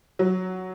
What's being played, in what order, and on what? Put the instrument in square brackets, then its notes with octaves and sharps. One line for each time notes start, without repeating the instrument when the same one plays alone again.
[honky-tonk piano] F#3